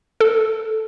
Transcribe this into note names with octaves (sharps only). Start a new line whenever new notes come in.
A4